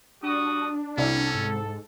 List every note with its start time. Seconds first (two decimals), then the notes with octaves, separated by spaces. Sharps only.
0.23 G3 D4 F#4 D#6
0.97 C2 C#4 E4 A4 D5
1.35 G#2